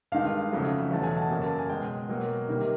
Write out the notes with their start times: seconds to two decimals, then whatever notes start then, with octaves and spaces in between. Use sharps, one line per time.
0.12 G2 D#3 G#3 F5
0.51 F2 C#3 F#3 A3
0.91 E2 B2 F#3 A3 A5
1.04 G#5
1.17 A5
1.29 F#2 C#3 F#3 A#3 G#5
1.42 A5
1.59 G#5
1.69 B2 G#3 G5
2.08 B2 F#3 A#3
2.48 C3 D#3 G3 A#3